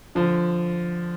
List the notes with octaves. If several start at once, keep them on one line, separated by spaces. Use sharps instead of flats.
D3 F3